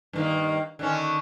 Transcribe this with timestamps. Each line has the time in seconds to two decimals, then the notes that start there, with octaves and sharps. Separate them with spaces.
0.13 G2 D#3 A#3
0.79 D3 D#3 C#4